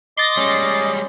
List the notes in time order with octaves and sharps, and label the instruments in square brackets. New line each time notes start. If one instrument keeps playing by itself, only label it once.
[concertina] D#5 D6 [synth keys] C6 A6 A#6
[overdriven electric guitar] G3 G#3 [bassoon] C#4